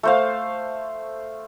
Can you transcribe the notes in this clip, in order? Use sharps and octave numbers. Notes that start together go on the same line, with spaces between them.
A3 C5 F5